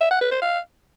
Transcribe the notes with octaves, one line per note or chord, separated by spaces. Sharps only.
E5
F#5
B4
C5
F5